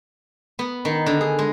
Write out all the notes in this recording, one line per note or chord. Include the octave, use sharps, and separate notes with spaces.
B3
D#3
D3
G#4
G#3